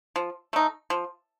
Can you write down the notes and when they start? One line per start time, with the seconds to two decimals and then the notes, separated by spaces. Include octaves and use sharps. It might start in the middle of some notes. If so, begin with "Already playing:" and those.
0.16 F3
0.53 A3 D#4
0.90 F3